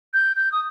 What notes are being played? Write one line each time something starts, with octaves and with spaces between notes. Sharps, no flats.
G6
G6
D#6